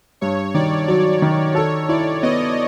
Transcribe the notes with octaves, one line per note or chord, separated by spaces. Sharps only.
G2 C#5
D#3 D5
F#3 D5
D#3
A4 C#5
E4 D5
B3 D#5